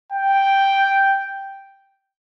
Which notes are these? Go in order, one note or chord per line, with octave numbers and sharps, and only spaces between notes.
G5